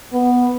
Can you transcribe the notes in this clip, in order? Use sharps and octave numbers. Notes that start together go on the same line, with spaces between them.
B3